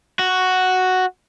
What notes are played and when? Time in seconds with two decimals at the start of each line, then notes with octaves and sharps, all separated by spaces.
0.19 F#4